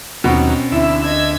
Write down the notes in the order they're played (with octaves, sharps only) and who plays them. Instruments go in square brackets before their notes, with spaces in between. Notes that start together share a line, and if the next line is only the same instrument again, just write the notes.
[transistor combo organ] D#2 F#3 [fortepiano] B2 [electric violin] C4 C#4
[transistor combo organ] D2 E5 [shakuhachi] E4
[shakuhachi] D#5 [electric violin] G#6 B6